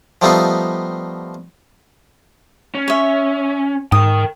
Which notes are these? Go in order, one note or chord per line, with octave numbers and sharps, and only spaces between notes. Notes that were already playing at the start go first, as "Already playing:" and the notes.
F3 G3 A3 B3 D#4 F4
C#4
C#5 E5
G#2 A#4 G5 D#6